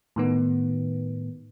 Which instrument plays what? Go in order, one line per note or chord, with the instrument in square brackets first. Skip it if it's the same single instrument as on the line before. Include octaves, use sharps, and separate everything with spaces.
[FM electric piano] A2 D#3 B3